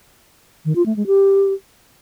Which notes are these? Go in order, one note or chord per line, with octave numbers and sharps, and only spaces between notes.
D#3
F4
A3
G#3
G4